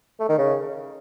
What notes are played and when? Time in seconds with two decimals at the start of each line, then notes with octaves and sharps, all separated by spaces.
0.20 A3
0.29 D#3
0.38 C#3